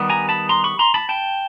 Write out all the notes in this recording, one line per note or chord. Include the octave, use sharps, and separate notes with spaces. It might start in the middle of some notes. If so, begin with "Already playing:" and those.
Already playing: D#3 G3 B3
G#5 A#5
A5 B5
A#5 C6
B5 C#6
A#5 C6
A5 B5
G5 A5